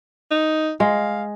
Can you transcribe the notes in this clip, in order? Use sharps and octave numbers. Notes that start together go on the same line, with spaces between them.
D#4
G#3 F5